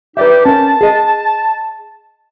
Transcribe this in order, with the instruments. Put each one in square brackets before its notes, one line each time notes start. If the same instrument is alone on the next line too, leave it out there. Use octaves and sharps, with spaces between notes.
[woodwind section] D#4 G4 [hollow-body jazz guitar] B4 D5 E5
[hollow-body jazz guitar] C#4 A#4 [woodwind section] A5
[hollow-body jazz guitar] G#4 D#5